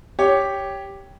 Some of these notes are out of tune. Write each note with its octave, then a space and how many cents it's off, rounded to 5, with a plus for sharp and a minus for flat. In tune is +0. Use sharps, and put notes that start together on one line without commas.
G4 +0 C#5 +5